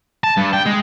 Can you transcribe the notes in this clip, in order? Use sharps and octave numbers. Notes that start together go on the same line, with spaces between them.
A5
G2
G5
G#3